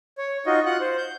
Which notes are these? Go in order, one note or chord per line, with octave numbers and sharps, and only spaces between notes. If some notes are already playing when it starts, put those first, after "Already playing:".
C#5
D#4 F4 F#4 D#5
F4 F#5 F#6
C5
G6